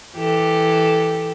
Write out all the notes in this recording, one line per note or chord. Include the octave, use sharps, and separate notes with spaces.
E3 G4 A4